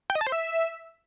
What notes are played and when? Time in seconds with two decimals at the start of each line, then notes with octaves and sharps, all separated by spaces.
0.10 G5
0.15 D#5
0.21 A5
0.27 C5
0.32 E5